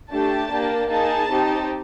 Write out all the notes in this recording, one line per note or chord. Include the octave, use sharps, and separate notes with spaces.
A3 D4 G4 A5
A#3 D4 G4
A#3 D#4 G#4 A5
C4 D#4 G4